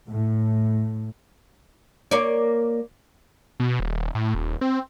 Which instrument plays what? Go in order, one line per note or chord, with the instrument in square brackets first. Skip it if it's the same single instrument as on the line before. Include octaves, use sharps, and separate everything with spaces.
[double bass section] A2
[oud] A#3 C#5 D5
[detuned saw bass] B2
D#1
A2
D#1
C4